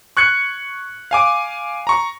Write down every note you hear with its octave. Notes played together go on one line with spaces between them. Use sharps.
C#6 F#6 G#6 C#7
F5 G#5 D6
A#5 C#6